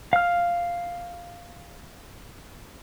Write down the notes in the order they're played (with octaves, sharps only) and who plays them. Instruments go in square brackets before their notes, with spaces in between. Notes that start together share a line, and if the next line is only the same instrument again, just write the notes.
[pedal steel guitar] F5 F6